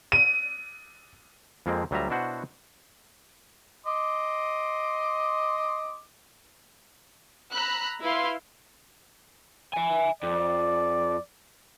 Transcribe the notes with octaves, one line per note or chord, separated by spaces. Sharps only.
D#7
F2 F3 G#3 A#3 C4
D2 F#3 G3 F4 E5 A#5
B2 D4 E4 F#4 C5 F#5
D#5 C6 D6
A#5 B5 E6 F#6
E4 B4 F5 C6
E5 G#5
F2 D5